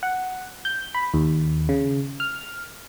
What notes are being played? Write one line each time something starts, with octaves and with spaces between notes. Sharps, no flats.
F#5
G6
B5
D#2
C#3
F6